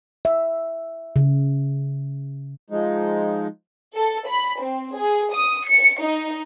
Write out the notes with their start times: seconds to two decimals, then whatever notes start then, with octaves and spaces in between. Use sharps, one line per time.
0.25 E5
1.16 C#3
2.70 F3 G#3 D#4
3.96 A4
4.28 B5
4.61 C4
4.96 G#4
5.34 D#6
5.68 C#7
6.00 D#4